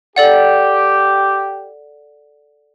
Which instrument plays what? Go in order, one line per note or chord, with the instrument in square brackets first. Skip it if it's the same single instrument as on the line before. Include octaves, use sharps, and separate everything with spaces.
[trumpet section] G4 [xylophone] A4 D5 F#5